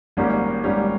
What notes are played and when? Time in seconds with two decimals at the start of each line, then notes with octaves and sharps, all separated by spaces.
0.17 G#1 G#2 G3 A#3 C#4
0.63 G#1 G#2 G3 A#3 C#4